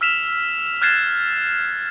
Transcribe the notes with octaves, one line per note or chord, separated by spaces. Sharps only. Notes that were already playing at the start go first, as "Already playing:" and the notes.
E6 F6 B6 E7 F7
F6 F#6 G#6 A6 C7 E7